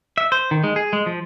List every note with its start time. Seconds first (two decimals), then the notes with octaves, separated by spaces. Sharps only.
0.18 E5
0.32 C5
0.51 D#3
0.64 G#3
0.76 G#4
0.93 G#3
1.06 F3